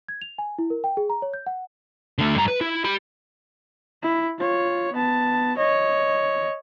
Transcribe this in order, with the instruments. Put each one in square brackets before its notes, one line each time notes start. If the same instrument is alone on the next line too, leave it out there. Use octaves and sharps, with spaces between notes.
[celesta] G#6
F7
G#5
E4
A#4
G5
G#4
A#5
C#5
G6
F#5
[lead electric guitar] D3 A3
G2 A#5
B4
E4
G4 B5
[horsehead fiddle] E4
F4 C#5
B3 A5
C#5 D#5